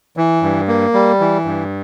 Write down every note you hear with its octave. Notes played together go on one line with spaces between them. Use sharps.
E3
G2
A#3
G3
E3
G2